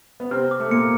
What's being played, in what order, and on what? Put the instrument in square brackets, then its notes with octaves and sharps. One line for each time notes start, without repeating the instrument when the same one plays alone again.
[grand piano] B3
[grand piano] C3 C4 [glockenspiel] F6
[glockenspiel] D6
[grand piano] A3
[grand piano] A#2 A#3 [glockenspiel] C#7